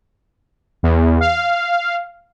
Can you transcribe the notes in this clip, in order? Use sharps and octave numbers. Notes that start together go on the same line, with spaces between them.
E2
F5